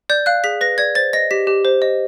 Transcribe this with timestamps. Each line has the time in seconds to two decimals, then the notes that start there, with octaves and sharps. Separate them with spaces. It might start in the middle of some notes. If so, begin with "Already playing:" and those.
0.10 D5 G6
0.26 F5 F#6
0.44 G#4 B6
0.61 B4 A#6
0.78 D5 G#6
0.95 C5 A6
1.13 D#5 A#6
1.31 G4 B6
1.47 G4
1.65 C5
1.82 D#5